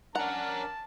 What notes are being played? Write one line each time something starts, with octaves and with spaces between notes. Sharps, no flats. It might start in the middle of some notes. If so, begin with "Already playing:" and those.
C#4 D4 A#4 C#5 F#5 A5 A#5